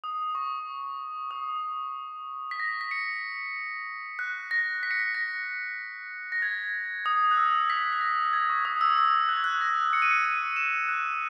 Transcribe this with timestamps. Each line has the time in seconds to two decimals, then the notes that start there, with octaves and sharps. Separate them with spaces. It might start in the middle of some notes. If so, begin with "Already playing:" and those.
0.04 D#6
0.35 C#6
1.31 D#6
2.51 B6
2.60 A#6
2.81 B6
2.91 C#7
4.19 F#6
4.51 A#6
4.83 B6
4.91 C#7
5.00 B6
5.15 A#6
6.32 A#6
6.42 G#6
7.06 D#6
7.31 F#6
7.37 E6
7.70 B6
7.93 B6
8.01 A#6
8.33 G#6
8.50 C#6
8.65 D#6
8.81 E6
8.98 E6
9.29 F#6
9.37 G#6
9.44 F#6
9.61 A#6
9.93 C#7
10.02 D#7
10.11 C#7
10.26 D#7
10.56 E7
10.88 F#6